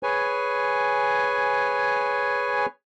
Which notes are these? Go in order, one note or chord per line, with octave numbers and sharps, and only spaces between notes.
G#4 B4 C#5 G#5